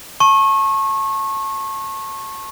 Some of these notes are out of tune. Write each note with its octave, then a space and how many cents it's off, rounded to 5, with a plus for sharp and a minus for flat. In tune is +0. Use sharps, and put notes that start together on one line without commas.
A5 +0 C#6 -30